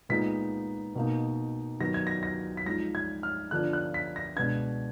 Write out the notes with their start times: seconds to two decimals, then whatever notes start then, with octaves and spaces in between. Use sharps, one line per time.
0.09 A#2 G#3 B3 D#4 B6
0.95 B2 A#3 D#4
1.80 D#3 F#3 B3 A#6
1.94 G#6
2.07 A#6
2.23 A#6
2.57 B6
2.66 F3 G#3 D#4 A#6
2.95 G#6
3.23 F6
3.51 D3 F3 B3 D4 F#6
3.73 F#6
3.94 B6
4.16 A#6
4.36 B2 G#3 B3 D4 G#6